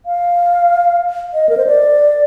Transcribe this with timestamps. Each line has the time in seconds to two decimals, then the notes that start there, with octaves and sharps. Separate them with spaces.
0.06 F5
1.34 D#5
1.49 A#4
1.57 C5
1.67 D5